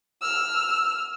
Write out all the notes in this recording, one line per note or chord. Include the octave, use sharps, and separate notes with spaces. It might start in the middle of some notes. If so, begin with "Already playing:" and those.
E6 F6